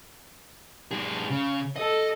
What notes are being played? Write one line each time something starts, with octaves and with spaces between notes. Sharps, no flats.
G2 G#4
C#3
A4 D#5